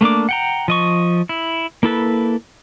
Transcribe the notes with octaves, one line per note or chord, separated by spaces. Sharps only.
A3 A#3 D4 D6
F#5 G5 A#5
F3 D#5 C#6
E4
A#3 E4 A4 B4